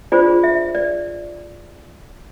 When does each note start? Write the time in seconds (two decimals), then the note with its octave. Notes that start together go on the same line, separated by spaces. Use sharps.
0.12 D4 F4 G#4 C5 D5
0.44 E5
0.75 D5